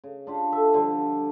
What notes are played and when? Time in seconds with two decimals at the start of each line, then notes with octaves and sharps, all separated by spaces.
0.04 C#3
0.27 D4 F4 G4
0.52 A4 E5
0.74 D3 F3 G3 A4